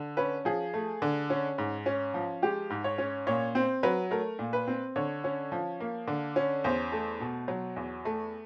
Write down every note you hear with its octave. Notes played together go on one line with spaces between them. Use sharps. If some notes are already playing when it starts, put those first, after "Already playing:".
Already playing: D3
C#4 B4
F3 G#4
A3
D3
C#4
G#2
C#4
F3
G#3 G4
G#2
C#5
C#4
A#2 C#5
C4 C5
F#3 B4
A3 A#4
A#2
B4
C4
D3 C#5
C#4
F3
A#3
D3
C#4
E2 C5
A3
B2
F#3
E2
A3